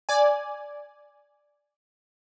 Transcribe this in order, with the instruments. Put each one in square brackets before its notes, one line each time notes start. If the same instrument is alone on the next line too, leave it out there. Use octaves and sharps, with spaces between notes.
[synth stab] D5 G#5